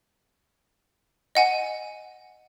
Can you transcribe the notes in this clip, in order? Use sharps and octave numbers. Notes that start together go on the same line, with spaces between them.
D#5 F#5 G#5